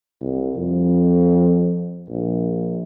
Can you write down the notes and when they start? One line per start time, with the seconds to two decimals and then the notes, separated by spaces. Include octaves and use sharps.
0.21 C2
0.57 F2
2.09 A#1